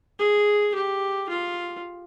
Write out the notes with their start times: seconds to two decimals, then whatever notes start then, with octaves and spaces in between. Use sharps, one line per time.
0.19 G#4
0.75 G4
1.29 F4